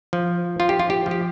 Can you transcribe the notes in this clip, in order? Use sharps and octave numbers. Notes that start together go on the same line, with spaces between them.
F3
F3 F4
G4
F4
G4
F3
G4